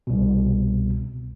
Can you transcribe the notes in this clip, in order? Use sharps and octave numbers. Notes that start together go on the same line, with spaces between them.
C2 B2